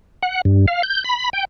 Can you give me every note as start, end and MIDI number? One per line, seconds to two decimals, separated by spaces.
0.23 0.41 78
0.45 0.66 43
0.68 0.82 77
0.83 1.03 91
1.04 1.30 83
1.33 1.45 79